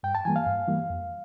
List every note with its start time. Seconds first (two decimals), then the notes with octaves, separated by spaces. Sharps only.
0.03 G2 G5
0.15 A5
0.25 E3 G3 A#3 G#5
0.36 F5
0.47 G2
0.68 E3 G3 A#3
0.90 F2